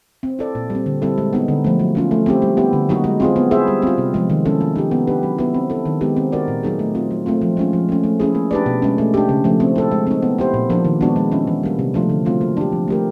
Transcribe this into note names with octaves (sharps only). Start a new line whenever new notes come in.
C4
E4 A4 D5
A#2
G3
C4
D3
G3 C4 E4 A4
G#3
B3 D#4
D3
F3 A3
F#3
A#3 C#4 F4
A3
C4 E4 G4
G3
B3 E4 G4
D3
F#3 A#3 D#4 F#4
G#3
C4 F4 G#4
B3
E4 G#4 C5 E5
G3
C4 F4
C3
F3 G#3
D#3
G#3 C#4 E4 A4
A#3
D#4 G4
B3
D4 G4 B4
F#3
B3 E4
C4
E4 A4
D#3
G#3 B3 D#4 G4
C4
D#4 F#4 A#4 D5
A#2
F#3 A#3 D#4 G#4
A3
C4 F4
F#3
A3 C4 F4
F3
G#3 C#4 F4
F3
A3 C#4
A3
C#4 E4 G#4
A#3
D4 G4 B4 D5
B2
G#3 C#4
A3
D4 G4
C#3
F3 A3
C4
E4 A4
G#3
C4 D#4
B3
E4 G4 C5
A#2
F3 A#3 D4
D#3
G#3 B3 D4 F#4
G#3
C#4 E4
E3
G3 A#3
C3
F3 A3 D4 F4
D3
F#3 A3 C4 F4
A#3
D4 G4
F3
A3 D4 G4 A#4